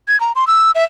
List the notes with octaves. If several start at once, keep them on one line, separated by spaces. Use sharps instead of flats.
G#6
A#5
C6
E6
E5